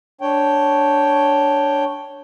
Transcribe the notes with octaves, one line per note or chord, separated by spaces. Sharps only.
D4 C#5 G5